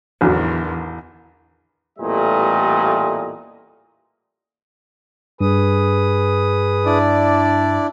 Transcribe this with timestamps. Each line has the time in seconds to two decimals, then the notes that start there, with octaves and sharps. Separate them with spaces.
0.21 A1 E2 D3 D#3 F#3
1.99 A1 E2 A#2 G3 A3 D#5
5.41 G2 G#4 B4 D#6
6.86 D4 E4 D5